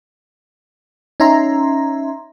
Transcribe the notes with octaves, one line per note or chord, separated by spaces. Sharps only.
C#4 D#4 E5 A#5 C6